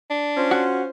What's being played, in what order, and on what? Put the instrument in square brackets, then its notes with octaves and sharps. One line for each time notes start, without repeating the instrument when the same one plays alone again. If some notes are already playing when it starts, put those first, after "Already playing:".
[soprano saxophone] D4
[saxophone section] C#4 F4 C5
[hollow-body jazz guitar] F#4